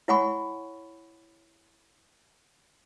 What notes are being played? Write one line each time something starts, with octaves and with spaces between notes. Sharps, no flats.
E4 C#5 F#5 G#5 B5 C#6